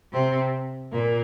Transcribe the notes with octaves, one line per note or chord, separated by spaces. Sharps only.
C3 C4
A#2 A#3